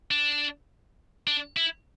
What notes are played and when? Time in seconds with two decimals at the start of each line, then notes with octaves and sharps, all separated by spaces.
0.11 D4
1.27 D4
1.57 E4